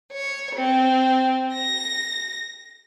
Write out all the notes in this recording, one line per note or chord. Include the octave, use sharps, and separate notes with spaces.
C#5
C4
A#6